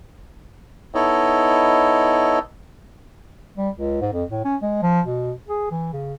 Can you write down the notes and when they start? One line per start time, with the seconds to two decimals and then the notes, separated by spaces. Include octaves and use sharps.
0.95 B3 D#4 E4 A4 C#5 D#5
3.57 G3
3.76 C#2
4.01 G#2
4.13 F2
4.30 A2
4.45 C#4
4.62 G#3
4.82 F3
5.06 B2
5.48 G#4
5.71 E3
5.93 C#3